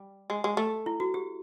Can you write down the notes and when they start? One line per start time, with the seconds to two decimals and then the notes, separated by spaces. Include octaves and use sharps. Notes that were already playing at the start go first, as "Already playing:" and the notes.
Already playing: G3
0.30 G#3
0.44 G#3
0.57 A3
0.86 E4
1.00 F#4
1.14 G4